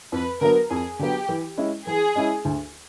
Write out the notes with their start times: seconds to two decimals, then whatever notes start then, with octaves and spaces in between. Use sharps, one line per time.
0.12 F2 B4
0.41 D3 F#3 B3 A#4
0.70 F2 G#4
0.99 D3 F#3 B3 G4
1.29 E3
1.57 G#3 C#4 E4
1.87 E3 G#4
2.15 G#3 C#4 E4
2.45 D2